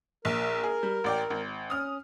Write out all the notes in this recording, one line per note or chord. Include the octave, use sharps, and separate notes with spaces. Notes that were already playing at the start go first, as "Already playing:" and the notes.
A#1 A#4
G#4
G3
A1 D5 G5
G#1
C#4 D#6 F6